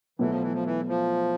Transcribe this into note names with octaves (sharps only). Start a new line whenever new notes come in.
B2 E3 F#3 A3
F3
E3
F3
E3
F3